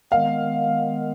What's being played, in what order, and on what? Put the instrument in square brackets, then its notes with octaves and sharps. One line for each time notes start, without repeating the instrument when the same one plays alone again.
[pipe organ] D#3 G#3 B3 [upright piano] F5